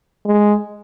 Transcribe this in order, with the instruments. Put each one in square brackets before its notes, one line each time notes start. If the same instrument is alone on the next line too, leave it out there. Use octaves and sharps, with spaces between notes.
[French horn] G#3